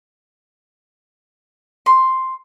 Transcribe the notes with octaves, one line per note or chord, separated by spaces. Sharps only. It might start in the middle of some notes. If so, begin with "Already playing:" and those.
C6